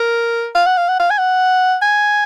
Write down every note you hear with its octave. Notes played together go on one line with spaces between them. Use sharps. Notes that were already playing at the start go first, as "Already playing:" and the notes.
Already playing: A#4
F5
F#5
F5
F#5
F5
G#5
F#5
G#5